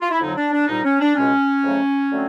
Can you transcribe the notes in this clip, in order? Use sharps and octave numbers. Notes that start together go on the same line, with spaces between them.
F4
E4
F2 D3 F#3 D#4
D4
D4
C2 A#2 G3 D#4
C#4
D4
C#2 B2 G#3 C#4
F2 C#3 F#3 A3
D3 F#3 A3 C4